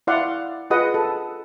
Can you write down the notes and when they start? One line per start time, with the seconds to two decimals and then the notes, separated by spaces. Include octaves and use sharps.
0.07 E4 D5 F5 F#5 C6
0.70 F4 G#4 B4 D#5 F#5 D#6
0.94 A4